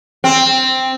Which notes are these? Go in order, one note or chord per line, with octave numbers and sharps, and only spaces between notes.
C4